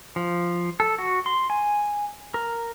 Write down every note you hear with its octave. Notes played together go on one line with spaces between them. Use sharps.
F3
A4
F#4
C6
G#5
A#4